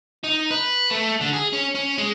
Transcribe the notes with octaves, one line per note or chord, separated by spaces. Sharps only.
D#4
B4
A3
D3
G#4
C#4
C#4
G#3